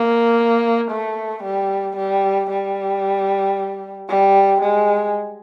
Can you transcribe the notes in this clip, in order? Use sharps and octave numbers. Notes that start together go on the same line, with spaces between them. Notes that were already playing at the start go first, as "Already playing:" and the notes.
Already playing: A#3
A3
G3
G3
G3
G3
G#3